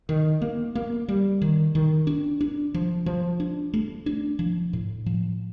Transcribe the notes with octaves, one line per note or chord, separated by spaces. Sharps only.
D#3
A#3
A#3
G3
D#3
D#3
D4
D4
F3
F3
D4
A3
D4
F3
A2
F3